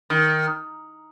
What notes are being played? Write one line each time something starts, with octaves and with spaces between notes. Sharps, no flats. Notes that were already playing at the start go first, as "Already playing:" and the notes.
D#3